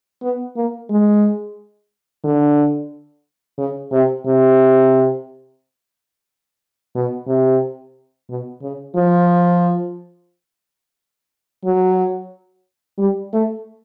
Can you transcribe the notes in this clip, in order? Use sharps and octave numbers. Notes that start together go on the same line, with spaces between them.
B3
A#3
G#3
D3
C#3
C3
C3
B2
C3
B2
C#3
F3
F#3
G3
A3